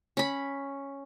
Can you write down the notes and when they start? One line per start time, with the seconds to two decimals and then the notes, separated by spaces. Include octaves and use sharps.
0.17 C#4 B5